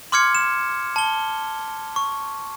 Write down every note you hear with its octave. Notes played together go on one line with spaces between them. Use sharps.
C6 D6 F6 G#6 C#7
E7
A5 G7
C#6